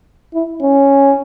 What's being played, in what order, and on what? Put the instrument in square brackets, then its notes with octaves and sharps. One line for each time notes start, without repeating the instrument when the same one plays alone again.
[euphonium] E4
C#4